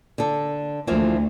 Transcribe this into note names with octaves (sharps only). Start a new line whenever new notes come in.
D3 A4
D2 E3 F3 A#3